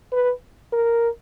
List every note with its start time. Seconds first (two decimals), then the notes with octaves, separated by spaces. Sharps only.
0.12 B4
0.72 A#4